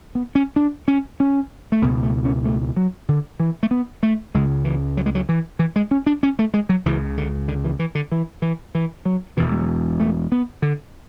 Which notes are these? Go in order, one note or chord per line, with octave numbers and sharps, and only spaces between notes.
B3
C#4
D4
C#4
C#4
A3
C#2 B2 B3
A3
C#4
A3
F#3
D3
E3
A3
B3
A3
C#2 C#3 G#3
E3
F#3
G#3
F#3
E3
E3
G#3
C#4
D4
C#4
A3
G#3
F#3
C#2 C#3 E3
D3
D3
E3
E3
D3
E3
E3
E3
F#3
E1 E2 B2 E3
G#3
F#3
A3
B3
D3